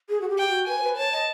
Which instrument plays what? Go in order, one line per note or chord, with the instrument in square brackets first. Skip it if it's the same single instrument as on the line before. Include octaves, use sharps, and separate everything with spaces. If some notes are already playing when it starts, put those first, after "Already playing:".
[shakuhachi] G#4
F#4
G4
[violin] G5
[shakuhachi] F#4
[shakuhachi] B4 [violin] G#5
[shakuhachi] C5
B4
[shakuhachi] C#5 [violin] A5
[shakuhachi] D#5